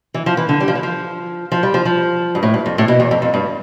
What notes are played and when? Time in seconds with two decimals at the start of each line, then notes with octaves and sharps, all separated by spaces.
0.14 E3
0.26 F3
0.37 E3
0.49 D3
0.60 G3
0.68 F3
0.75 E3
0.83 F3
1.52 F3
1.63 G3
1.74 F3
1.85 F3
2.35 G2
2.43 A2
2.54 G2
2.66 F2
2.78 A2
2.88 B2
3.00 E2
3.11 F2
3.22 F2
3.34 G2